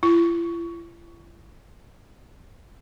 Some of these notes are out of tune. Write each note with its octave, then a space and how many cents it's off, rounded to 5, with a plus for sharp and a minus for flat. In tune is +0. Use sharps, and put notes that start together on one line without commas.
E4 +45